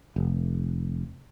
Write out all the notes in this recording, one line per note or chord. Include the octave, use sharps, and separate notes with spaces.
F1